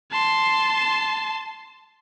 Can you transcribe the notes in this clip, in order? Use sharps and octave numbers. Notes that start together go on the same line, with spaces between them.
A5 C6